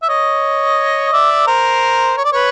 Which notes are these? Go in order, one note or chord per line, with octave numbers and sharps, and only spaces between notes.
E5
C#5 D#5
D5 E5
A#4 C5
C#5
D5
B4 C#5